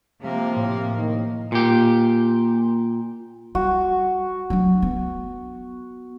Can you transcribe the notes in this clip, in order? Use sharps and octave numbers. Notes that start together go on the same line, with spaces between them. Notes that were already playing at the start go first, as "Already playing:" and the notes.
C3 F3 A#3
A2 C3
D#3
A#2 G4
G3 F#4
F#3 D4
B3